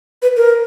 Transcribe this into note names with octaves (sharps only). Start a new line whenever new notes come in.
B4
A#4